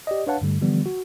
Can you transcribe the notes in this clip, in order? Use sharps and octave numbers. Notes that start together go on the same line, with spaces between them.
G4 D5 D#5
D4 B4 C#5 F5 F#5 A5
G2 D3 G3 A3
D3 E3 F3 G3 B3
F#4